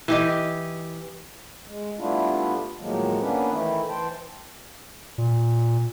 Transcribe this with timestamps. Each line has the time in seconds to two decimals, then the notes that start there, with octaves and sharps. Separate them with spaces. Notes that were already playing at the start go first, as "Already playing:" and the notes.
0.08 E3 G4 D#5
1.67 G#3
1.98 G3 A3 B3 D4 E4 F4
2.79 A2 D#3 F3 F#3 G#3 A#3
3.19 A#3 B3 C#4 D4 B4
3.50 D#3 E3 A3 E4
3.89 E3 C5 G5 A5
5.18 A#2